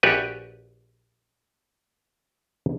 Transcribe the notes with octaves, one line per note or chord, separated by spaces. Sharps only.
A#1 F#4 G4 B4 D5 G#5